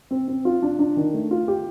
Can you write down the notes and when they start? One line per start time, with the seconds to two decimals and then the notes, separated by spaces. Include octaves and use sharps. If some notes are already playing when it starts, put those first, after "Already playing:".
0.11 C4
0.28 C4
0.45 F4
0.62 D4
0.79 D4
0.97 D#3
1.14 A3
1.31 F4
1.48 G4